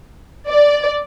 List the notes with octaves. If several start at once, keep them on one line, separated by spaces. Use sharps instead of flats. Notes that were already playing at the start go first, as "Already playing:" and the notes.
D5